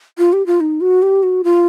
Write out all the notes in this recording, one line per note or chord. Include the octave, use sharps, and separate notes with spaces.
F4
G4
F4
D#4
F#4
G4
F#4
F4